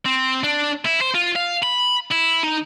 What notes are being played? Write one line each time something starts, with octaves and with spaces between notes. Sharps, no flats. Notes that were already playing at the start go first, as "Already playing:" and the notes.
C4
D4
E4
C5
F4
F5
B5
E4
D#4